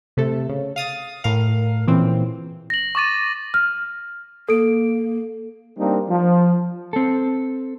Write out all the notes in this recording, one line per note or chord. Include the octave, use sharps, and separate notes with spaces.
C3 A3 A4
C#3
F5 D#6 A6
A2 A#4 F5
A#2 C#3 E3 C4
A#6 F#7
C#6 D6 A6 D#7
F6
A#3 A4 D7
G3 A#3 C4 D4 D#4
F3
C4 A4